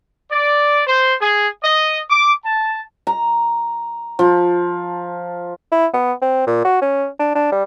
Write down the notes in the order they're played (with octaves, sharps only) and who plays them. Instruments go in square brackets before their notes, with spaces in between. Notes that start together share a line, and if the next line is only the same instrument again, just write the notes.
[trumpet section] D5
C5
G#4
D#5
D6
A5
[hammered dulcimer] A#5
F3
[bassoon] E4
B3
C4
A#2
F#4
C#4
D4
D4
G3